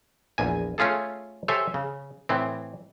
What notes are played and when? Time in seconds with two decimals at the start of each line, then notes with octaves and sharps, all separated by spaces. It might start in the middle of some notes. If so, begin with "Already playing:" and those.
0.38 A#1 E2 G#5
0.78 A3 C#4 F4 G#4 A4
1.48 G4 A4 C5 C#5 E5 G#5
1.74 C#3
2.29 A2 E3 C4